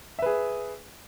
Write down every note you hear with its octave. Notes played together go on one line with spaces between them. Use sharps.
G#4 B4 E5